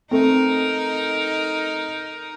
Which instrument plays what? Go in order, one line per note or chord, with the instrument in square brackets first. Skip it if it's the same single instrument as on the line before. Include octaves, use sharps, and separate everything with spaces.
[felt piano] A3 C4 [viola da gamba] D#4 A#4